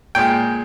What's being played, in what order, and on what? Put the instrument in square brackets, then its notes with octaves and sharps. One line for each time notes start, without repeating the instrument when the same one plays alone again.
[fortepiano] A#2 G#3 G5